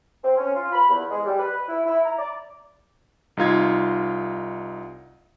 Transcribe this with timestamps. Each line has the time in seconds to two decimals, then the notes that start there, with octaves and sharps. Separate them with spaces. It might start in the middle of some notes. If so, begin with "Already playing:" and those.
0.22 C4
0.37 C#4
0.54 F4
0.72 B5
0.89 E2
1.09 G#3
1.25 G3
1.39 B4
1.67 E4
1.85 E4
2.05 A#5
2.17 D5
3.37 C2 D#4 F4 G#6